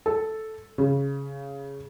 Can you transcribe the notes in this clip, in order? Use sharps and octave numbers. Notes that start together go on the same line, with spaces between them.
A4
C#3